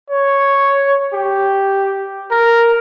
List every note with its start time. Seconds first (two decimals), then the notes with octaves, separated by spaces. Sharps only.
0.10 C#5
1.13 G4
2.31 A#4